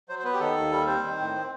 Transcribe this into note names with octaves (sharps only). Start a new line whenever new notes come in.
F#3 C5
C5
B3 B4
G4
D#3 A4
D#2
G3
C4 C5
D#3
A2
C4